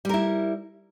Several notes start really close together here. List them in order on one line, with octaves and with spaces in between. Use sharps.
G3 A#4 E4